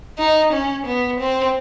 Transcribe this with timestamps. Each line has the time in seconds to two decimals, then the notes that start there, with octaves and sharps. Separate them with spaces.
0.19 D#4
0.53 C#4
0.87 B3
1.20 C4